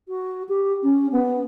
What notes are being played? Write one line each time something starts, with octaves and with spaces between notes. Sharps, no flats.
F#4
G4
C#4
B3